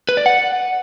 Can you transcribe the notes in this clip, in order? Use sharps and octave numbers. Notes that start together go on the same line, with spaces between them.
B4
D5
F#5